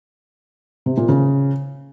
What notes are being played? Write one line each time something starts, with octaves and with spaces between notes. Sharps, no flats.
C3
A#2
C#3